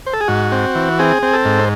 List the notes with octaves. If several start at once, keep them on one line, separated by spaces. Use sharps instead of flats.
C5
A4
G#4
G#2 F#4
C4
E3
C4 G#4
C4
A4
G#2
C5